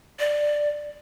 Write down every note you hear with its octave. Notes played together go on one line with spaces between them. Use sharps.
D5